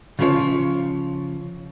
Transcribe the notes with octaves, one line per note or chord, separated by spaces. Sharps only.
C#3 F3 C#5